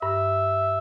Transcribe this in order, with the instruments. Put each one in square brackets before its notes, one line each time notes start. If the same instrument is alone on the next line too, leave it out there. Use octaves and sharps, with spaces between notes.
[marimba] G2 [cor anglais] E5